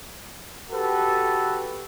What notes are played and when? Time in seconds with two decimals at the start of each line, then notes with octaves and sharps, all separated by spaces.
0.71 F#4 G4 A4 B4